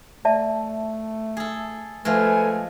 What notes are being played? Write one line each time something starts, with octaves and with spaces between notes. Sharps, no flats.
A3 D5 E5 A5
G#4 A4
F3 G#3 A3 A4 B4 G#5